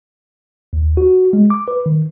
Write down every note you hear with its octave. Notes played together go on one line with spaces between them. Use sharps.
D#2
F#4
G#3
D6
B4
D#3